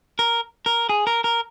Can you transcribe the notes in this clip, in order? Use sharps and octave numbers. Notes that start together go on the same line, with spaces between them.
A#4
A#4
G#4
A#4
A#4